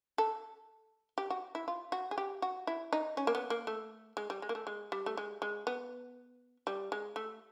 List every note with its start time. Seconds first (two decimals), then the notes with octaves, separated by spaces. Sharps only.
0.18 A4
1.18 G4
1.30 F#4
1.55 E4
1.68 F4
1.92 F#4
2.11 G#4
2.18 G4
2.42 F#4
2.67 E4
2.93 D#4
3.17 C#4
3.27 A#3
3.35 B3
3.50 A#3
3.67 A3
4.17 G#3
4.30 G3
4.42 G#3
4.49 A#3
4.55 A3
4.67 G#3
4.92 G3
5.06 A3
5.17 G#3
5.42 G#3
5.67 B3
6.67 G3
6.92 G#3
7.16 A3